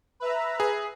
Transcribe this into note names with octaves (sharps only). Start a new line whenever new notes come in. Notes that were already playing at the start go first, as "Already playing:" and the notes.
B4 E5 A#5
G#4